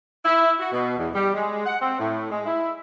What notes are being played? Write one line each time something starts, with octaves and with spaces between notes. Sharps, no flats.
E4
F#4
B2
E2
G3
G#3
F#5
C4
A2
G#3
E4